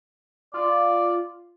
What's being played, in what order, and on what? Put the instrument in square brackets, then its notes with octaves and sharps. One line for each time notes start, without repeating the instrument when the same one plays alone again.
[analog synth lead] F4 [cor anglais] D5